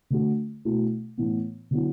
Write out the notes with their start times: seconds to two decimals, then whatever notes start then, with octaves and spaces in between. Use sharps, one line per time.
0.10 D3 A3 F#4
0.65 B2 A3 E4
1.18 A2 E3 B3
1.71 D3 F#3 B3 E4